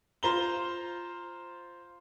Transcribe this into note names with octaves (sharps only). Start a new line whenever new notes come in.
F4 C5 A#5 G7